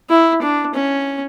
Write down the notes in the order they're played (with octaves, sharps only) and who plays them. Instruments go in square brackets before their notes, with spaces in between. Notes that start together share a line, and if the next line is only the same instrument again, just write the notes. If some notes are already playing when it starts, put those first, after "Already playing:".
[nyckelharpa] E4
D4
C#4